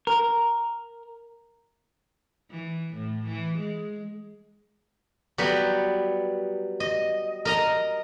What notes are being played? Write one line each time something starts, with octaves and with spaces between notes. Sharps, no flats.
A#4
E3
A2
E3
G#3
F#3 G3 B3 B4
D#5
A#4 D#5 A#5